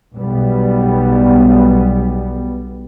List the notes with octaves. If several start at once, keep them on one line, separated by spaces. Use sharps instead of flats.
B1 B2 G3 B3